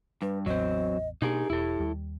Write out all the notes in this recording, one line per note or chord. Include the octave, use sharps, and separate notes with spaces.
G2 B4
A1 E2 F#3 C4 D#5
B2 A#3 D4 D#4 G4 G#4 A#4
E1 E4 A4
D#2 G3